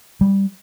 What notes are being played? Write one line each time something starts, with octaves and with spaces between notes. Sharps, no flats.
G3